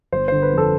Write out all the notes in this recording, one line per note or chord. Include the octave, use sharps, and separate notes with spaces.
G1 C5
D3 C5
B4
F2
A4